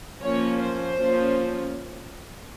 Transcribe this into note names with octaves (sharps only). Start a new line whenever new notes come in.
F3 A#3 C#4 C#5
C5
F3 A#3 C#4